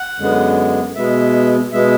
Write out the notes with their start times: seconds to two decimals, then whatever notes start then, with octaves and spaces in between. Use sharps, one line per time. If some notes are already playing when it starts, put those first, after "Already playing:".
Already playing: F#5
0.18 F#2 D3 G#3 B3
0.95 B2 G#3 B3 E5
1.72 B2 G#3 B3 E5